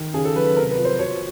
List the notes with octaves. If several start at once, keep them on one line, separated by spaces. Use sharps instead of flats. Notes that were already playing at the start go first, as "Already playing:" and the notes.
Already playing: D#3
C#3 G#4
A4
F#3 B4
B4
C3 A#4
B4
F3
C5
B2 C#5